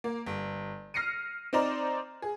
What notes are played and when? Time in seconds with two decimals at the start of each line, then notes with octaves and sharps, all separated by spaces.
0.04 A#3
0.26 G1
0.94 F6 A#6 C7 C#7 D#7
1.53 C4 D#4 C5 D5 A#5
2.22 G#4